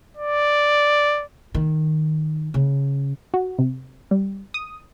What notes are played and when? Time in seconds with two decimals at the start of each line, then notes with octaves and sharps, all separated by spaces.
0.17 D5
1.55 D#3
2.54 C#3
3.34 F#4
3.58 C3
4.11 G3
4.54 D#6